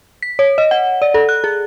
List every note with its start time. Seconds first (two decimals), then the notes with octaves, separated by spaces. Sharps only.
0.22 B6
0.39 C#5
0.58 D#5
0.71 F#5
1.02 D5
1.14 A4
1.29 F#6
1.44 G#4